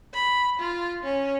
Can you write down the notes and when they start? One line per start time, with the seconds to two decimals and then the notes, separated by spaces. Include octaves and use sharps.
0.13 B5
0.60 F4
1.03 C#4